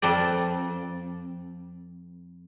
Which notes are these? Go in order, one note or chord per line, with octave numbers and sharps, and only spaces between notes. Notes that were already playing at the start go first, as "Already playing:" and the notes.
F2 C4 A4 D5